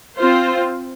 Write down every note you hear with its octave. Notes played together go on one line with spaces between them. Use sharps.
C4 F4 C5